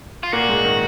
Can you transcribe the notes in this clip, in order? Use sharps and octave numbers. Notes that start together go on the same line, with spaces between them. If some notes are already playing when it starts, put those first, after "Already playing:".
F4
A#2 A#3 F#4
G#2 G#3
D#3